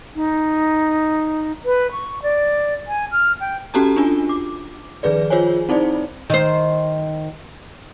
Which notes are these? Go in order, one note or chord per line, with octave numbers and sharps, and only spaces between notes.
D#4
B4
C#6
D5
G#5
F6
G5
C#4 F#4 G4 A4 A5 A#5
D4 F4 G#5
D6
D#3 F3 G#4 B4 D5
F4 G#4 C5 C#5 G#5
C4 D#4 E4 C5 D5
D#3 C5